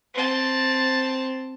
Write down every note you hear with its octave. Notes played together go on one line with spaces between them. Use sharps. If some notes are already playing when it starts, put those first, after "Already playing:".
C4 A5